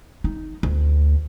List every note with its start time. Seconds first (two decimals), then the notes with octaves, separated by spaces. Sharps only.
0.24 D#4
0.63 D2